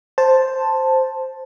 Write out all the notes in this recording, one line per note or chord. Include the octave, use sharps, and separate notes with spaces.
C5 A5